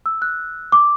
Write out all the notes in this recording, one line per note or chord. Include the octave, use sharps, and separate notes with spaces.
E6
F#6
D6